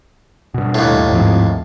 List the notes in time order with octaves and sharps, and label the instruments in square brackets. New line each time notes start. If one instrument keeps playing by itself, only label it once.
[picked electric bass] G2 B2
[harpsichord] D#2 A2
[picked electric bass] G#2 F3 C4